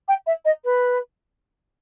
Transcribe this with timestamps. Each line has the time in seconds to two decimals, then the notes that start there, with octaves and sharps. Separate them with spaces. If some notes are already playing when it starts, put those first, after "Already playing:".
0.08 G5
0.26 E5
0.45 D#5
0.64 B4